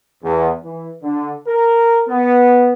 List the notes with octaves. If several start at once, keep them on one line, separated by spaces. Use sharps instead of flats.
E2
E3
D3
A#4
B3